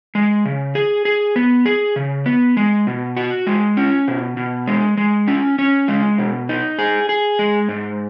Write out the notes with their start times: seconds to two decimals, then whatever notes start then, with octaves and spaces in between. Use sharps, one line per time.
0.15 G#3
0.45 C#3
0.75 G#4
1.05 G#4
1.36 B3
1.66 G#4
1.96 C#3
2.26 B3
2.57 G#3
2.87 B2
3.17 F#4
3.47 G#3
3.77 C#4
4.08 B2
4.37 B2
4.67 G#3
4.97 G#3
5.27 C#4
5.59 C#4
5.88 G#3
6.18 B2
6.49 D#4
6.79 G#4
7.09 G#4
7.39 G#3
7.69 G#2